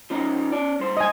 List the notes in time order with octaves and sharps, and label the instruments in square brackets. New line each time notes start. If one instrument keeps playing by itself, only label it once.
[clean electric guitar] F3 C#4 D#4
C#4 D5
G2 C5
[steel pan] D#5 G#5